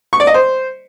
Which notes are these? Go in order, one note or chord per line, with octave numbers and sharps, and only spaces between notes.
C#6
D5
D#5
C5